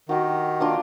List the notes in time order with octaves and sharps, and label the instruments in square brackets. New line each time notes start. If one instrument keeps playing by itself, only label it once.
[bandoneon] D#3 [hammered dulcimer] F#4 G4
[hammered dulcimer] A#3 D4 F4